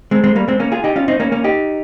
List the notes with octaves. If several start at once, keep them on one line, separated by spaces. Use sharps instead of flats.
G#3 C4
G#3 C4
G3 A#3
G#3 C4
A#3 C#4
F4 G#4
D#4 G4
C#4 F4
C4 D#4
A#3 C#4
A#3 C#4
D#4 G4